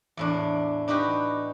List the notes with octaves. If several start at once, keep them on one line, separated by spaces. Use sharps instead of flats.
E2 A2 D4
D4 D#4 F#4 G4 B4